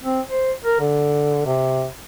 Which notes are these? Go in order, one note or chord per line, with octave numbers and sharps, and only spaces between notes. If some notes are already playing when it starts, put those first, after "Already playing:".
C4
C5
A#4
D3
C3